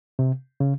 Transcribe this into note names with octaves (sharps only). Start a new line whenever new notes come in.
C3
C#3